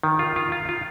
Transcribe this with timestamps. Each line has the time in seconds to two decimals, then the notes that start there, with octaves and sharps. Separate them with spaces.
0.03 D#3
0.19 F4
0.36 F4
0.52 F4
0.69 F4